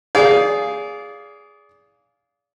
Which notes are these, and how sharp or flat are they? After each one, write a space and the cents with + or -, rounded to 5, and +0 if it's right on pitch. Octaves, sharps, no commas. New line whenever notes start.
G#4 +0 D5 -30 F5 +0